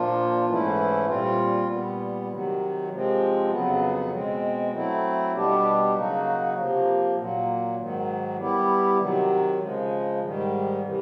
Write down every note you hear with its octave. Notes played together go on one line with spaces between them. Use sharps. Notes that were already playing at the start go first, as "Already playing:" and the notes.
Already playing: A#2 F3 A#3 D4 F4
G#2 E3 A3 C#4 E4
A#2 G3 C4 F4
A#2 G3 B3
C3 D#3 F#3
C3 F3 G#3 C4
F2 C#3 F#3 B3
B2 G#3 C4
F#3 A3 C4 E4
B2 G3 B3 D4 G4
C#3 F#3 A#3 D#4 F#4
C3 F3 A#3
A#2 F#3 A#3
G#2 D#3 F#3
G3 B3 E4 G4
C3 D#3 F#3
C#3 F3 G#3
G#2 D#3 G3
C3 E3 G3